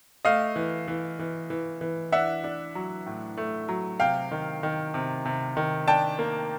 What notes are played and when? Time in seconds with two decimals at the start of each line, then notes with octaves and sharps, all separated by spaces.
0.25 A3 D#5 F5
0.56 E3
0.88 E3
1.19 E3
1.50 E3
1.81 E3
2.12 D4 E5 F#5
2.44 D4
2.75 F#3
3.06 A2
3.38 A3
3.69 F#3
4.00 C3 F5 G5
4.31 D#3
4.63 D#3
4.94 C3
5.26 C3
5.57 D#3
5.88 D4 G5 A5
6.19 A#3